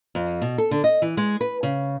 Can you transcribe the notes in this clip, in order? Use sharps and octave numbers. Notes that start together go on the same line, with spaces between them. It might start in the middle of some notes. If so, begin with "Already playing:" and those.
F2
B2
A4
D3
D#5
E3
G#3
B4
C#3